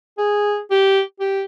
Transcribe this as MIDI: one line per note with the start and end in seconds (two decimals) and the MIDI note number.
0.18 0.60 68
0.71 1.01 67
1.20 1.43 67